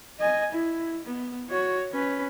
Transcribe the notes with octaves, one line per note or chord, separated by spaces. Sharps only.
D#5 G#5
E4
B3
F#4 C#5
C#4 B4